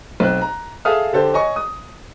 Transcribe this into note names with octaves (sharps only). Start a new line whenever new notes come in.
B1 C4 F#6
A#5
G#4 A4 E5 F5 D#6 F6
D3 G4 A4 C5
C#5 D#5 G#5 C#6
D#6